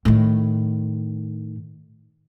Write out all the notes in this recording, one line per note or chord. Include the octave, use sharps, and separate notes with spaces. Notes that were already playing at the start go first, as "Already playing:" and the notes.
A2 D#3